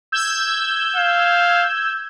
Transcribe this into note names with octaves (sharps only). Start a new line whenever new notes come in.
E6 G6 G#6
F5